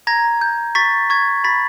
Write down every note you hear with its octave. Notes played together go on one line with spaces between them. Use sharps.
A#5 G#6 A#6
G6
C#6 A6 B6
C#6 G#6
B5 A6 B6